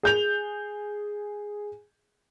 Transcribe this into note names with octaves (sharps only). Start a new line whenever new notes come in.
G#4 G6 F7